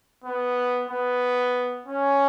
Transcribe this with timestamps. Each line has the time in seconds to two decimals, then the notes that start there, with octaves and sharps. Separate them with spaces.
0.24 B3
0.89 B3
1.86 C#4